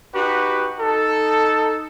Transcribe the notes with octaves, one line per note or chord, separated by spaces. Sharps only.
D#4 F#4 G4 B4
D#4 A4